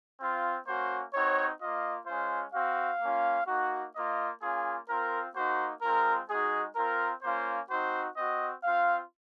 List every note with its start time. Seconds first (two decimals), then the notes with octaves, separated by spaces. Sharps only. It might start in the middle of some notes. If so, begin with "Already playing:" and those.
0.19 C4 F4
0.67 A#3 C#4 F#4 C5
1.13 C4 D#4 F#4 C#5
1.60 A#3 F4 D#5
2.07 G#3 C#4 F4 C5
2.53 C4 F#4 F5
3.01 A#3 C#4 F4
3.47 A#3 D#4 F#4
3.94 A#3 F4 D#5
4.42 A#3 C#4 F4 G#4
4.88 C4 F4 A#4
5.35 A#3 D#4 F#4 C5
5.82 G#3 C4 F4 A#4
6.29 G#3 D#4 F#4 G#4
6.76 C4 F4 A#4
7.22 A#3 C#4 F4 C5
7.69 C4 D#4 F#4 C5
8.16 C4 F#4 D#5
8.64 C4 F4 F5